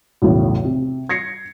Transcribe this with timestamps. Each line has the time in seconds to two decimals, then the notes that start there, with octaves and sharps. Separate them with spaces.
0.22 B1 E2 A2 C#3
0.65 C3
1.09 G#6 A#6 C7 C#7